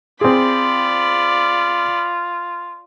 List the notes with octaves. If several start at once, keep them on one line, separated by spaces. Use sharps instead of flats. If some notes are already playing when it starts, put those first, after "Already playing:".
C4 F4 G#4 D5 B5